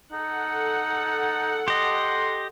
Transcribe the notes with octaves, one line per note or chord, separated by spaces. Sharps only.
D#4 A4 F#5
G4 D#5 C6